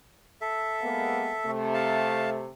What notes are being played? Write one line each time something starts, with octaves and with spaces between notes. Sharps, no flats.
A4 E5
G#3 A#3 B3
C3 A3
F5 A5